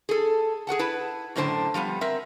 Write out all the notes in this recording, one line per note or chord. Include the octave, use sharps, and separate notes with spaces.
G#4 A4
G#4 B4 F#5 A5
E4 B4 A5
F#2 A2 D3 C5 A5
F3 G3 A#3 B3
C4 A#4 E5